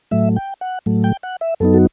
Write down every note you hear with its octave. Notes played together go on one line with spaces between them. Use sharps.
A2 F#3 A3 E5
G5
F#5
A2 F#3 A3
G5
F#5
E5
F#2 F#3 B3 D#4 A4
F#4